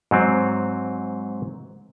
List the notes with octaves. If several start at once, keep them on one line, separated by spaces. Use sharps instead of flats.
G#2 F#3 C4